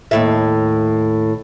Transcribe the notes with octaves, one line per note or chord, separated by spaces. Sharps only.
D#2 A2 E5